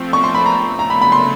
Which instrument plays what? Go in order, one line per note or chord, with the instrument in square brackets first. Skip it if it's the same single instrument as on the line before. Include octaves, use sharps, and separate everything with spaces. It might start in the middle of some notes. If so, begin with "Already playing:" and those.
Already playing: [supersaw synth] F3 A3 C4
[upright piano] C#6
C6
B5
A#5
[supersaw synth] C#3 F#3 A3 [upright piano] A#5
[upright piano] B5
B5
C6